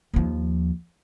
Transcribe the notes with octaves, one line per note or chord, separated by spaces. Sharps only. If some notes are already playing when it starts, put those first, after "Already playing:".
D#2 F3